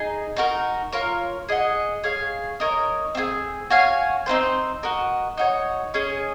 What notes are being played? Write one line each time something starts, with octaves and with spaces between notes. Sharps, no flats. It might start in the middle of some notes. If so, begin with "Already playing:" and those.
Already playing: D#4 G#4
D#4 F#4 A#4
F4 A#4 C#5
G#4 D#5 F#5
G#4 C#5 F5
D#4 A#4 C#5
C4 F4 G#4
F#4 C#5 F5 G#5
C4 D#4 G#4 C5
F#4 A#4 D#5
D#4 F#4 C#5
C#4 G#4 D#5